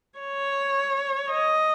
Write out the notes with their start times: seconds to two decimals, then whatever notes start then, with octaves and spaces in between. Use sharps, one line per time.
0.20 C#5
1.30 D#5